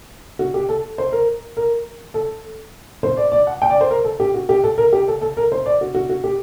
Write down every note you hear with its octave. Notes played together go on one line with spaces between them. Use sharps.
F#4
G4
A4
C5
A#4
A#4
A4
C5
D5
D5
F#5
G5
D5
C5
A#4
A4
G4
F#4
G4
A4
A#4
G4
A4
A4
A#4
C5
D5
F#4
F#4
F#4
G4